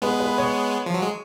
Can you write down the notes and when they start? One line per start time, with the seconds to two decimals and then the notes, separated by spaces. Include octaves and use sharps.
0.02 G#3 B3 B4
0.20 B4
0.38 C#5
0.86 F3
0.94 F#3
1.01 G#3